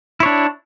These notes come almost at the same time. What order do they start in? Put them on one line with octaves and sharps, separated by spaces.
E4 C#5 D4